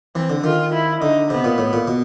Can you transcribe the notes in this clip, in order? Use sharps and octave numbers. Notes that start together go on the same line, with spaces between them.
E3 C4
D3
D#3 F4
E4
D3 D#4
C3 B3
A#2
A2
A#2
B2